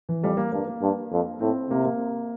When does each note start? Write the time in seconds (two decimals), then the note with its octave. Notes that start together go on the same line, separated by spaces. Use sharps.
0.09 E3
0.23 F2 G3
0.37 A#3
0.52 G2 A#3
0.68 A#3
0.82 G2
1.12 F2
1.41 A2 C4
1.71 C3 A#3
1.85 A#3